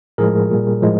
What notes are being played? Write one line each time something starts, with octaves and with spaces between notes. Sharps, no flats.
A2 F3 G#3 G#4 A#4
A#2 G3
A2 F3 G#3